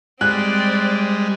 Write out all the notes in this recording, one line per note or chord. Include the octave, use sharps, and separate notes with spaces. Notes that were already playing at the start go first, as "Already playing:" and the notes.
G3 G#3 C4 D5 F#6